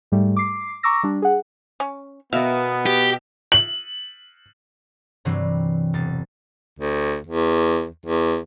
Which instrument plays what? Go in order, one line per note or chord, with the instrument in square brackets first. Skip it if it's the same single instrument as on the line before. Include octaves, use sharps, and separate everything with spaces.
[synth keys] G#2 G3 A3
D6 C7
A#5 C#6 D6 E6 A#6
G3 D4
G#4 F#5
[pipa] C#4
[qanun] B2 A#4 [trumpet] B3 [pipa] E5 F5
[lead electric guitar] G4
[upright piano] F#7
[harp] G2 C3 E3 F#3 G3 C4
E1 A6
[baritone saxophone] D2
E2
E2